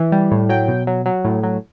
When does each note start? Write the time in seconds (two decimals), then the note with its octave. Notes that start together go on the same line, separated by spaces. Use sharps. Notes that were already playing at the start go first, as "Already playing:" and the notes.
Already playing: E3
0.12 G3
0.31 A2
0.49 F#3 G5
0.68 B2
0.87 F#3
1.06 F#3
1.24 A2
1.43 F#3